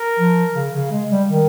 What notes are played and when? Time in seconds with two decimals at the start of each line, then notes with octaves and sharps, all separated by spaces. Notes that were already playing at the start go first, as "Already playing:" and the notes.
Already playing: A#4
0.19 F3
0.55 C#3
0.74 C#3
0.92 G#3
1.11 G3
1.30 D#3